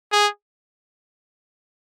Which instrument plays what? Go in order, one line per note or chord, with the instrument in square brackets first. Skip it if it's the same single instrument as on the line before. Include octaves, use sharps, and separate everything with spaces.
[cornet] G#4